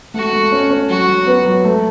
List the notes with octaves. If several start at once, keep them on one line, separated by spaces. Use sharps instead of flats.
A3 F#4
A3
C#4
C#4
F#3 F#4
F#3
B3
F#3
A3